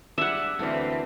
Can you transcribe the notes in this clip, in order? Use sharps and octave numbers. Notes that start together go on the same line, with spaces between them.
G3 G#3 D4 E5 F#5
D2 E3 A3 A#3 C4 D4 B4